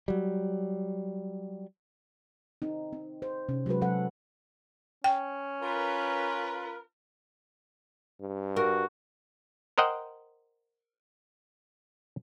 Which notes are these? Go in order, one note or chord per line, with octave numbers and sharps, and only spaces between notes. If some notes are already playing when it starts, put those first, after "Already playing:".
F#3 G3
C4 D#4
C4
C5
C3 C#4
F#3 G#3 F#4 B4
F#3 A4 F#5
C#4 G5
F4 A#4 B4
G2
F#4 A#4
A#4 C5 D#5 F#5 G5